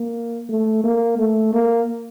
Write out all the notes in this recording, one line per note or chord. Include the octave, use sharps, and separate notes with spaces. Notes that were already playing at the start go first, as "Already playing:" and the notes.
Already playing: A#3
A3
A#3
A3
A#3